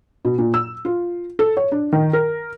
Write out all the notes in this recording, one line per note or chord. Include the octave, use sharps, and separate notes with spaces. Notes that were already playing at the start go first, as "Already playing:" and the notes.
B2
A#2
E6
F4
A4
C#5
D4
D#3
A#4